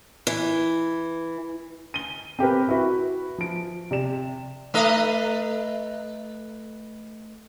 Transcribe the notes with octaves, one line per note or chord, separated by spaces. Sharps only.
E3
D#7 G7
C4 G4 A#4 B4
E4 F#4 B4
F3 D7
C3 D5 E7
A3 B4 D#5